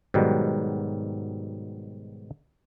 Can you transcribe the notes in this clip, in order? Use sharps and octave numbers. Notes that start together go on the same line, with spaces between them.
G#2 B2 D#3 F#3 G3